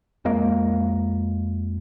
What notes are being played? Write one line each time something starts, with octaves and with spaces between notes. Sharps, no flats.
F2 G#3 A#3